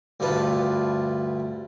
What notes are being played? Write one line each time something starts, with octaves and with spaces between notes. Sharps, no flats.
D2 G2 F4 B4 A5